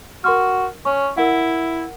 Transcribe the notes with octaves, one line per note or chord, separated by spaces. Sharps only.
F#4 A#4 C6 F6
C#4 C#6
E4 A#4 F#5